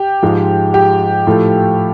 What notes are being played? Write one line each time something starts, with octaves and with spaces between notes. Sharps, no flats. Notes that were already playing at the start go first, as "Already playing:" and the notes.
Already playing: G4
G#2 F3 G#3
G4
A2 F3 A3